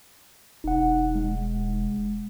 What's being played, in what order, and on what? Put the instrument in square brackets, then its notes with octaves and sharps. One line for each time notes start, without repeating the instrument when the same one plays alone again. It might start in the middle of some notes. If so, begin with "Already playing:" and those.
[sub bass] E1 [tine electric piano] D#4 F#5
[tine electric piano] G#3